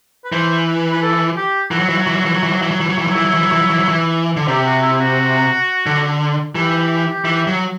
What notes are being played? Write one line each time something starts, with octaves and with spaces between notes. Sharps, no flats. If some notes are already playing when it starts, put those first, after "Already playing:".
B4
E3 C5
B4
B4
A4
G4
E3 F#4
F#3
E3
F#3
E3
F#3
E3
F#3
E3
F#3
E3
F#3
E3
F#3
E3
F#3 E4
E3
F#3
E3
F#3
E3
F#3
E3
F#3
E3
D3
C3 G4
F#4
E4
F#4
D3
E3 G4
E3
F#3